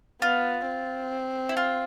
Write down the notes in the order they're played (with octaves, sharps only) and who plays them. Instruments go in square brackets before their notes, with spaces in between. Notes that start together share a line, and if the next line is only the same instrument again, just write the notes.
[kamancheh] B3 [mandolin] F4
[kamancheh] C4
[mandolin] E4
F4